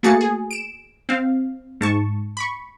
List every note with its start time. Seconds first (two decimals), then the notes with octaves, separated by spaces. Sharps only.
0.03 A3 A#3 F#4 G#4 A6 C#7
0.21 G#4
0.51 D7 E7
1.09 C4 F5
1.81 G#2 A5 C#6
2.37 B5 C#6